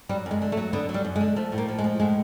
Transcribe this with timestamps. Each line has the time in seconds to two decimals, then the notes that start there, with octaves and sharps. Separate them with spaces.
0.09 F#3 G3
0.26 F#2
0.31 G#3
0.42 D3
0.52 A3
0.57 F#3
0.73 D3 B3
0.89 F#3
0.94 G3
1.05 F#2
1.16 G#3
1.21 D3
1.36 F3 A3
1.52 A2
1.58 A#3
1.68 F3
1.79 G#3
1.84 F3
2.00 A2 G#3